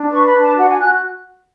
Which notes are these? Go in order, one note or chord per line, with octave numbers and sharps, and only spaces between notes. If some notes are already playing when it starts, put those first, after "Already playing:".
Already playing: D4
B4 C#6
B5
D4
A5
F#4 F#5
G#5
F#4 F#6